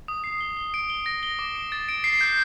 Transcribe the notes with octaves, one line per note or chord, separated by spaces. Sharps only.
D#6
C7
G7
G7
D7
G7
A#6
G7
D6
D7
A6
D7
C7
G6